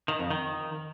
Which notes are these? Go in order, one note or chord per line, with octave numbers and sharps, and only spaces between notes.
D#3
F2
D#3